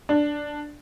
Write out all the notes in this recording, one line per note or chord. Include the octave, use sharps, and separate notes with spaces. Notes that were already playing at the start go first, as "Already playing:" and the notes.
D4